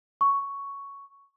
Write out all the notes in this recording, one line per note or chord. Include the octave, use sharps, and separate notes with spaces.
C#6